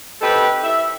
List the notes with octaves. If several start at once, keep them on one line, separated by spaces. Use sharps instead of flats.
C4 D#4 G4 A4 B4
E5